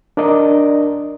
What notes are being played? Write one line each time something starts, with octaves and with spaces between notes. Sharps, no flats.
D4 A#4 D5 D#5